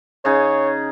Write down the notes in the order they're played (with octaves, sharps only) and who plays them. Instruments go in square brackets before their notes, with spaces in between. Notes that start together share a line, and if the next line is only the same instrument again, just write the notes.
[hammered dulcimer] C#3 D#4 G#4 [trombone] C#5